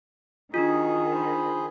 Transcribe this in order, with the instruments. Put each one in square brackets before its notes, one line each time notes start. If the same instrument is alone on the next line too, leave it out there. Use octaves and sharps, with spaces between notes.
[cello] D#3 [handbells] D4 F4 [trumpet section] F#4 D#5 [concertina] G#4
[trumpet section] C5 B5